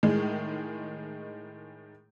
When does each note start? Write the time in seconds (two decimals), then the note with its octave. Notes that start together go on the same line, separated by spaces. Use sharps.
0.03 A2 D#3 G#3